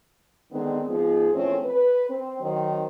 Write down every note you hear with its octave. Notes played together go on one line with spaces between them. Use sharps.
D3 D#3 G#3 B3 C4
G#2 F3 G#3 B3 G#4
E2 A#2 F3 A3 C4 C#4
B4
C4
D#3 F#3 C4